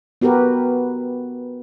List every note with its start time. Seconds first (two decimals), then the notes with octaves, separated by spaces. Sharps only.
0.21 B3 F#4 G4 A#4 B4